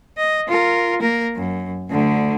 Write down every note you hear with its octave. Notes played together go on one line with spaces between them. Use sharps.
D#5
F4 A#4
A#3 A#4
F#2
D2 D3